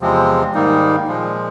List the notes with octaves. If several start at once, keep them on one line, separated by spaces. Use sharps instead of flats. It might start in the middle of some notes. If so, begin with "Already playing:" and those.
E2 C3 F3 G#3 C4
G#2 D#3 G3 A#3 D#4
A#2 F3 G#3